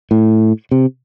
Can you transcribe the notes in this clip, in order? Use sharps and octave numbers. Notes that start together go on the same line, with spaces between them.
A2
C3